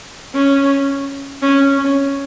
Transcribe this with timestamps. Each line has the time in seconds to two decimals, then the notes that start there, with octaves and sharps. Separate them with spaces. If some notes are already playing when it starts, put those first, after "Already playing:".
0.35 C#4
1.42 C#4
1.78 C#4